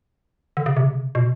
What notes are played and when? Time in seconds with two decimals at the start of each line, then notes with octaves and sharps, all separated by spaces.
0.57 D3
0.66 C#3
0.77 C3
0.84 C#3
0.92 C3
1.15 B2